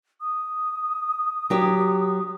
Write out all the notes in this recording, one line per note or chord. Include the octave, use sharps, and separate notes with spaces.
D#6
F#3 G4 C#5